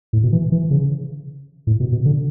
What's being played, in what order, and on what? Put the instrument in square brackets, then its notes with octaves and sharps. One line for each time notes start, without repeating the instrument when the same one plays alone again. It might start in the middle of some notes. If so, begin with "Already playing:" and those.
[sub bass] A2
B2
E3
E3
C#3
A2
B2
B2
D3